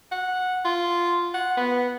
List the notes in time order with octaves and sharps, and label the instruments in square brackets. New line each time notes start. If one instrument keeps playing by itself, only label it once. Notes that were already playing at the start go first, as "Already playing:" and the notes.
[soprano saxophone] F#5
F4
F#5
B3